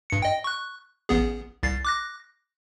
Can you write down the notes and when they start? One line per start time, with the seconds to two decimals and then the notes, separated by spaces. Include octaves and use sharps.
0.10 G2 C#7
0.22 D#5 G5
0.44 C#6 F#6
1.09 A1 B3 G#4
1.63 C2 A6 C7
1.85 D6 F#6 A#6